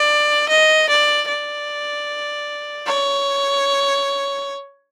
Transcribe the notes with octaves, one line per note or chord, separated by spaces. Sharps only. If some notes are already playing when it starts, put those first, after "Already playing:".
Already playing: D5
D#5
D5
D5
C#5